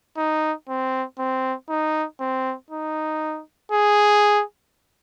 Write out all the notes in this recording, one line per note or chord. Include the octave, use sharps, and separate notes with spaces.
D#4
C4
C4
D#4
C4
D#4
G#4